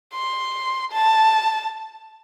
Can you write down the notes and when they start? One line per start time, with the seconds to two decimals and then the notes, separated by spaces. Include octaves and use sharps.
0.13 C6
0.92 A5